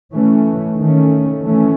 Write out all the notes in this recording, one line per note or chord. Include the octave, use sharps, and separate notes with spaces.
E3 A3 C#4
D#3 A3 C#4
E3 A3 C#4